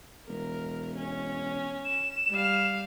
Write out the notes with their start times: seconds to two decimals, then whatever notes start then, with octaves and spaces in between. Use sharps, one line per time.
0.28 E1 A#4
0.97 C#4
1.85 E7
2.31 G3 F5